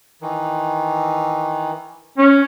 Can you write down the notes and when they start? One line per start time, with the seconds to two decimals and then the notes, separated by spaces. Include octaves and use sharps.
0.22 D#3 E3
2.18 C#4